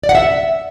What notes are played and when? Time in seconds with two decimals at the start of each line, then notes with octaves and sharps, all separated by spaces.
0.04 D5
0.09 F#5
0.15 E5